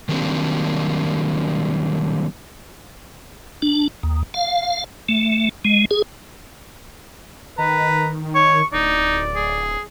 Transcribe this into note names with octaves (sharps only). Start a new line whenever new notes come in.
D#3 F#3 G3 A#3 C4 D4
D4
D#2
F5
A3
G#3
G#4
D#3 B4 A#5
C#5 C#6
D1 D#4 D5
G#4